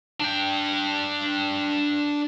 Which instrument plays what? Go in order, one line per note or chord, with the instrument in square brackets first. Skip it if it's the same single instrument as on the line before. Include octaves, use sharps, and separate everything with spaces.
[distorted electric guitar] D4 G5